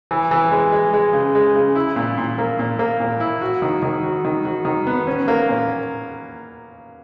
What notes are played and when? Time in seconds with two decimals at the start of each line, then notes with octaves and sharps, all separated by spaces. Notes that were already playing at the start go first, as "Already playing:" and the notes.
0.11 E3
0.31 E3
0.52 G#3
0.72 G#3
0.93 G#3
1.13 C#3
1.35 G#3
1.55 C#3
1.75 E4
1.96 A#2
2.18 A#2
2.38 A#3
2.59 A#2
2.79 A#3
3.00 A#2
3.20 E4
3.41 F#4
3.62 D#3
3.82 D#3
4.03 F#4
4.25 D#3
4.45 F#4
4.65 D#3
4.87 B3
5.07 C#4
5.28 A#3
5.49 A#2